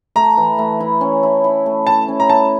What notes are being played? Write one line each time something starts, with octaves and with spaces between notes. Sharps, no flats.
A3 A#5
E3
A3
E4
C#4
E4
E4
A3
E4 A5
C#4
A#5
E4 A5